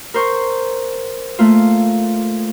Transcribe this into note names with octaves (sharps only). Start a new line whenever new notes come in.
A#4 C5 C#6
A3 A#3 F4